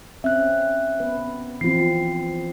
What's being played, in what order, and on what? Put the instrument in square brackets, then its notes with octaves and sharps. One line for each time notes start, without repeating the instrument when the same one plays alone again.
[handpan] C4 C#4 [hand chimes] E5 F#6
[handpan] B3 B4
[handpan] E3 F3 C4 [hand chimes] F4 C7